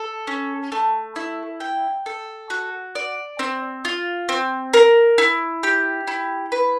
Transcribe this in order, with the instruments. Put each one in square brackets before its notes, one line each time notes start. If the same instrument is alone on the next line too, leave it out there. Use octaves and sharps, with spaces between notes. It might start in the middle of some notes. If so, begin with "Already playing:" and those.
Already playing: [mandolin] A4
C#4
A3
E4
G5
A4
F#4
D5
C4
F4
C4
A#4
E4
G4
E4
B4